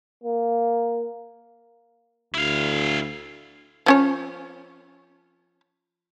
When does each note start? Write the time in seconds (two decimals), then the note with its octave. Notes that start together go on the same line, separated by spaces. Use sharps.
0.24 A#3
2.34 D2 E4 F5
3.86 F3 C#4 C#5